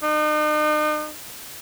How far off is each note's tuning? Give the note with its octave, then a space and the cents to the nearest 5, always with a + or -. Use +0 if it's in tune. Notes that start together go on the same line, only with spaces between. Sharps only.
D#4 -40